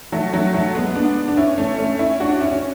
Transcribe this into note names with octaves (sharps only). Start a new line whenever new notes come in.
F#3 A3
F#3 A3
F#3 A3
G#3 B3
B3 D4
D4
C#4 E4
A3 C#4
A3 C#4
C#4 E4
D4 F#4
C#4 E4
C#4